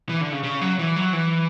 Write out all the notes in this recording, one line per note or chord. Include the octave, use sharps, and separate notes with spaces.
E3
D3
C#3
C#3
F#3
E3
F#3
E3